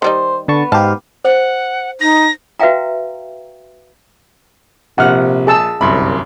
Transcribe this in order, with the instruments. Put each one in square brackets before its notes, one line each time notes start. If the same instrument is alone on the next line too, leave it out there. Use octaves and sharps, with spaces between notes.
[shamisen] D#3 G3 D#4 [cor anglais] C5
[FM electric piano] D3 A5 C#6 [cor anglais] B3
[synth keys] G#2 [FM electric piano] G4 F5 [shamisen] A5
[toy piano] C5 [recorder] F#5
[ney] D#4 [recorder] A#6
[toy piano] F#4 B4 E5 F5 G5 A#5
[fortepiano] A#1 F6 [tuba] C3 [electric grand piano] E5 [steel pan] F#5
[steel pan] G#4 A5 E6
[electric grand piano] G1 F#2 C6 [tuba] C2 [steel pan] E5 [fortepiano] B5